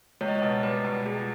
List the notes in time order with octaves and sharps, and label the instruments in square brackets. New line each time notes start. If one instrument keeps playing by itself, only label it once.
[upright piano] C#2 [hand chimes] C#5
[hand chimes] D#5
C#5
[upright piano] B2
[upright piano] G3 [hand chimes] B4
[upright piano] B2
[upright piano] C#2 [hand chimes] G#4